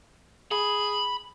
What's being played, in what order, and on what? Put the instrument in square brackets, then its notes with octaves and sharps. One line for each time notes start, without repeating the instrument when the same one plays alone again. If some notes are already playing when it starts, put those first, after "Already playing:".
[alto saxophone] G#4 [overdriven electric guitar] B5